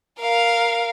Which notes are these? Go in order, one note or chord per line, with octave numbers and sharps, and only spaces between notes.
A#4 F5